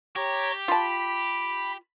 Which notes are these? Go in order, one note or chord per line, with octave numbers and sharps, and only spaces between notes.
G4 C#5 A#5 G#6
F4 A5 B5